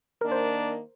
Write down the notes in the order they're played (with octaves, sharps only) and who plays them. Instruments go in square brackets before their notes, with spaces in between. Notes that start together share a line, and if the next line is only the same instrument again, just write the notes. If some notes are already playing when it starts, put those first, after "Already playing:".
[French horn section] D#3 A#3 D4 [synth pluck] A#4
[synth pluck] C5